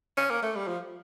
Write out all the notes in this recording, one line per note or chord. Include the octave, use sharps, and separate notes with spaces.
C#4
A#3
A3
G3
F3